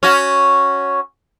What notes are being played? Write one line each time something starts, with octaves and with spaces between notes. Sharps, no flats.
C#4 F#4